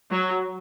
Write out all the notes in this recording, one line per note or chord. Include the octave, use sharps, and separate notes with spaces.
F#3